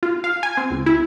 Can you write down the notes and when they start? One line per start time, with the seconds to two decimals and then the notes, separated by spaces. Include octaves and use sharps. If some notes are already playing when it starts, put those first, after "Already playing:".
0.03 F4
0.24 F5
0.43 G#5
0.57 C4
0.71 C#2
0.86 E4